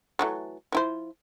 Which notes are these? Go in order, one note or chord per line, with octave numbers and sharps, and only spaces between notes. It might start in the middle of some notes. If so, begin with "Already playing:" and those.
E3 F#3 A3
F3 E4 C5